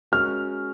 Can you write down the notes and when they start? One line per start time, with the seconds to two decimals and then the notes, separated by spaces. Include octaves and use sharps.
0.12 G#3 C#4 F#4 A#4 F6